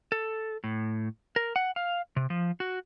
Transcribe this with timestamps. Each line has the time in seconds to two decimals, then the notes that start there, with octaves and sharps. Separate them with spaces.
0.12 A4
0.64 A2
1.36 A#4
1.56 F#5
1.76 F5
2.16 C3
2.30 F3
2.60 F#4